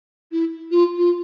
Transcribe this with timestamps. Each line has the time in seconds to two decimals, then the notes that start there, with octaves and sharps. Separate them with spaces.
0.32 E4
0.71 F4
0.98 F4